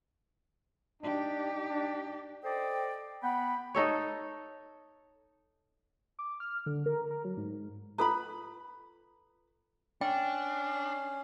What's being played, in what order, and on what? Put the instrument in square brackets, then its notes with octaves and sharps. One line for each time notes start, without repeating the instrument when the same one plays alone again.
[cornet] D4 [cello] D#4 G4
[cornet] D4
[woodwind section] A4 C5 D5 D#5 G5
B3 F#5 G5 B5
[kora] D#4 A4 C#5
[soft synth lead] D6
F6
D3
A#4
A#4
F#3
G#2
[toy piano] F4 A4 A#5 [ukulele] B4 B5
[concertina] C#4 [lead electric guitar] D4 [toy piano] G5